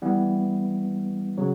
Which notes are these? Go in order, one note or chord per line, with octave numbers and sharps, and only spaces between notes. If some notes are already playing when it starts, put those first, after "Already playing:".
E3 G3 B3
C#3 F#3